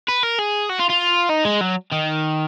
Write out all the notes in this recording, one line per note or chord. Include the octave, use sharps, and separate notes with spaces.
B4
A#4
G#4
F#4
F4
F4
D#4
G#3
F#3
D#3